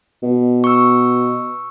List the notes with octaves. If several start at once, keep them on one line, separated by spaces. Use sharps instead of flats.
B2
C#6 E6